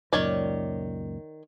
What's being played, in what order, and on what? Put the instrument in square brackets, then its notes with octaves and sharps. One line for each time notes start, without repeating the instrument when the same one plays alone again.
[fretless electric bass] C#2 F#2 A#2 [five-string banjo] D#3 C#5 D5